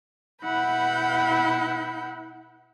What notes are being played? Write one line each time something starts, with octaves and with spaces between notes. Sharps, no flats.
B2 E4 F#5 B5 G6